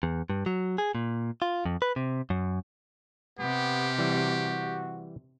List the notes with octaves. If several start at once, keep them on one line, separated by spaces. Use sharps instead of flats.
E2
G2
F#3
G#4
A#2
F4
F2
B4
C3
F#2
C3 B3 G4
E3 G3 F#4